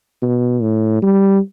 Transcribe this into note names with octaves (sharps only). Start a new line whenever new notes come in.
B2
A2
G3